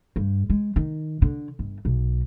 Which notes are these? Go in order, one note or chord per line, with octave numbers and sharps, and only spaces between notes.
G2
G#3
D#3
D3
G1
B1